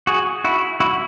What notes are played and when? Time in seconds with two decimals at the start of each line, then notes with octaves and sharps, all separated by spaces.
0.07 F#4 G#4
0.44 E4 F#4
0.80 E4 F#4